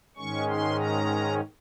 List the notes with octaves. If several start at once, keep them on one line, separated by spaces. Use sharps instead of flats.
G#2 D#3 G#3 C#4 C#6
C6
A#5